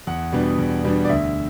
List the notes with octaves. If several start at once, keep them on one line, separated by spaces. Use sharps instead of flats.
E2 F#5
B2 G3 B3 D4
E2
B2 G3 B3 D4
D5
D2 E5